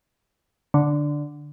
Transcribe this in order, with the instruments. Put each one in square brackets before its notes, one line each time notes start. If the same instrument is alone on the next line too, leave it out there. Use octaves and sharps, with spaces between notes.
[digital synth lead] D3